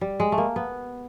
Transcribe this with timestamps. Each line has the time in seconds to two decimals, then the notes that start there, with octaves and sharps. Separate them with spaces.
0.01 G3
0.20 G#3
0.32 A3
0.38 A#3
0.56 B3